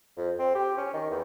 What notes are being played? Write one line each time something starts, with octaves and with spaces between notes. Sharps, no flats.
F2
C4
G4
C#4
D#3
E2